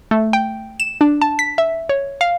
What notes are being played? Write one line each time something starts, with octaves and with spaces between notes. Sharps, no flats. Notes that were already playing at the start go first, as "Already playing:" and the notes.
A3
G5
E7
D4
A5
B6
E5
C#5
F5